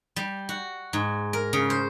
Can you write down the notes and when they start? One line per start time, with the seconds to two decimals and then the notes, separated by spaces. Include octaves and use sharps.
0.16 G3
0.49 F#4
0.93 G#2
1.33 A#4
1.53 C#3
1.70 C5